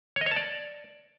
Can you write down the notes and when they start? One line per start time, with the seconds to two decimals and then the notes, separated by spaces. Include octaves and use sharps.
0.16 C#5
0.21 D#5
0.26 C#5
0.31 A5
0.36 D5